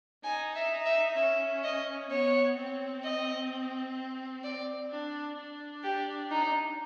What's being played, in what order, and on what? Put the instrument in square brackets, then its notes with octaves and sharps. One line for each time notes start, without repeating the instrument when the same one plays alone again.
[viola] D#4 [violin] G#5
[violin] E5
[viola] D#4
[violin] E5
[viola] C#4 [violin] E5
[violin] D#5
[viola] B3 [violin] C#5
[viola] C4
[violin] D#5
D5
[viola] D4
D4
[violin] G4
D#4